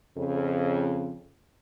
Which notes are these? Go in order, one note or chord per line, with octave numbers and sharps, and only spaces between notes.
F2 C#3